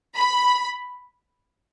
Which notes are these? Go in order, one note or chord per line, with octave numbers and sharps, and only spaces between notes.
B5